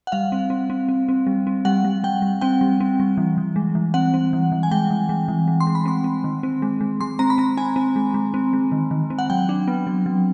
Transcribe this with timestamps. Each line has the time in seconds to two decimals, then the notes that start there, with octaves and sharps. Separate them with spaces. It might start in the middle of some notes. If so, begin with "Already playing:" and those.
0.07 F#5
0.12 G3 F5
0.32 C4
0.50 C4
0.70 C4
0.89 C4
1.09 C4
1.27 G3
1.47 C4
1.65 G3 F#5
1.84 G3
2.04 G3 G5
2.22 G3
2.41 C4 G5
2.61 G3
2.80 C4
3.00 G3
3.18 E3
3.38 E3
3.56 G#3
3.75 E3
3.94 C4 F#5
4.14 C4
4.33 E3
4.52 E3
4.63 G#5
4.71 G#3 G5
4.90 E3
5.09 G#3
5.28 E3
5.48 G#3
5.60 C6
5.67 G#3
5.75 B5
5.85 C4 C6
6.04 C4
6.24 D#3
6.43 C4
6.62 G#3
6.81 G#3
7.01 G#3 C6
7.19 C4 A#5
7.30 B5
7.38 C4 A#5
7.57 C4 G#5
7.76 C4
7.96 G#3
8.14 G#3
8.34 C4
8.53 G#3
8.72 D#3
8.91 D#3
9.10 C4
9.19 F#5
9.30 F#3 G5
9.49 D4
9.68 B3
9.87 F#3
10.06 F#3